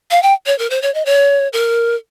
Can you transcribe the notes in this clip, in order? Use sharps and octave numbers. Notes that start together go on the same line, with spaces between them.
F5
G5
C#5
A#4
C5
C#5
D#5
C#5
A#4